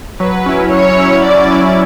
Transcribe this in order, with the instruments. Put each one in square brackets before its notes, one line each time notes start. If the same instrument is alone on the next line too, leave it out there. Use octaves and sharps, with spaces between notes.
[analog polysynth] F#3 [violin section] B4
[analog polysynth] C#4 E4
[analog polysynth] F#3 [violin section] C#5
[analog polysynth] C#4 E4
[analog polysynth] F#3 [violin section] D5
[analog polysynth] C#4 E4